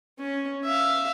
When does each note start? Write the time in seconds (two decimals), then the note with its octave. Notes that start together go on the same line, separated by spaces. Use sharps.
0.19 C#4
0.64 E5 F5